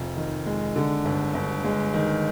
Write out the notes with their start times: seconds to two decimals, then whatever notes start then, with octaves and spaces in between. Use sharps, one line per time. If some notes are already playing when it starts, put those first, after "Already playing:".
Already playing: F1 F3
0.17 D#3
0.46 G#3
0.76 D3
1.05 G1
1.34 G1
1.64 G#3
1.94 D#3